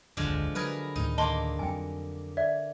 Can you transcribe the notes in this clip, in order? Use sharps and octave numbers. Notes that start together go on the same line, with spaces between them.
D1 G#1 F2 D3 F3 G#3
F#3 G#4 A#4 B4
D2 A2 D#3 D#4
D3 A#3 D#5 A5 C6 G7
F2 F#3 G5 G#5
D5 E5